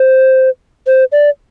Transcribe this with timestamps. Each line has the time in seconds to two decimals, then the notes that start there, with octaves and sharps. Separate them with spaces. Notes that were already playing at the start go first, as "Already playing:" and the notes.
Already playing: C5
0.87 C5
1.12 D5